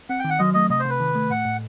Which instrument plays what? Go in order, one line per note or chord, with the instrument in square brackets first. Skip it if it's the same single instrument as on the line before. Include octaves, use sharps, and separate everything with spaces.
[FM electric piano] C4 [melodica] F#5
[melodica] G5
[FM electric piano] D#3
[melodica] F#5
[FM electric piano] F#3 [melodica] D#5
[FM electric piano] A3 [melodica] D#5
[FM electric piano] C3 [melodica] D#5
[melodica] C5
[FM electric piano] C3 [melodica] B4
[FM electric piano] D#3
A3
[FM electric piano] A2 [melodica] F#5
[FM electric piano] A2